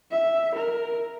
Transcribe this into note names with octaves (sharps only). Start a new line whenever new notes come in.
E5
A#4